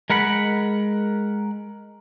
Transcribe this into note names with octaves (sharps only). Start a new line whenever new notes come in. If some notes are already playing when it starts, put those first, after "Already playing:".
G#3 A#4 F#5 B5